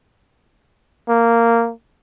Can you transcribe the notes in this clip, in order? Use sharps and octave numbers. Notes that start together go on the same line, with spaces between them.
A#3